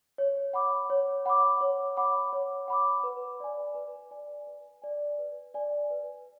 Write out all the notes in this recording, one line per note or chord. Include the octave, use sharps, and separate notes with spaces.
C#5
F#5 B5 D6
C#5
F#5 B5 D6
C#5
F#5 B5 D6
C#5
F#5 B5 D6
B4
D5 G#5
B4
D5 G#5
B4
D5 G#5
B4
D5 G#5
B4